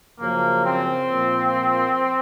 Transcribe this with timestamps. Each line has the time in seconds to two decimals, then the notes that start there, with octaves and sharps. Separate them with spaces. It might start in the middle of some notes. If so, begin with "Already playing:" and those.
0.19 F#2 C#3 F3 A#3
0.65 C4
1.10 A#2 F3